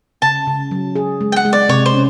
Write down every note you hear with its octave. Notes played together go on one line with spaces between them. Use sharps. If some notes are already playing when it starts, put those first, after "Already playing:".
C#3 A5
C#3
F#3
G#4
G#3
G5
F#5
G#3
D5
C3 C#5
C5
C#4